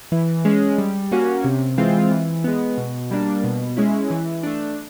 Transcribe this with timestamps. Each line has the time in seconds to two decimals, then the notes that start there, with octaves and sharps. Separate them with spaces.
0.12 E3
0.45 G#3 C#4
0.78 G3
1.12 A#3 C#4 F#4
1.44 C3
1.78 E3 G#3 C4 F4
2.11 E3
2.44 G#3 B3
2.77 B2
3.11 G3 A#3 D4
3.44 B2
3.77 G#3 C#4 E4
4.10 E3
4.43 A3 D4